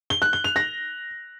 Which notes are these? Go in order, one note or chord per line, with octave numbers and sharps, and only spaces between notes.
G7
F#6
G7
F7
A#6